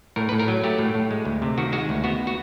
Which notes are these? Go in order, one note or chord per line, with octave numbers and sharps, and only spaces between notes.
A2 A#4
B4
A2
A#4
F#3
A3 G4
A2
A2
G#3
D2
C3
D#3 F#4
G#3 F#4
D2
B3 F#4
F#4